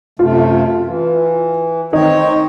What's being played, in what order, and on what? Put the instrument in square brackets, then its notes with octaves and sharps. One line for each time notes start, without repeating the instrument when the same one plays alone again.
[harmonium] F#2 C3 A3 [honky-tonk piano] F4
[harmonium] E3
[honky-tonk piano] D#3 D#4 [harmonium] C4 C#5